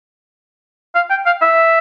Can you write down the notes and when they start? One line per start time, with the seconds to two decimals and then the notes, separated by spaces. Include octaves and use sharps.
0.95 F5
1.10 G5
1.26 F5
1.42 E5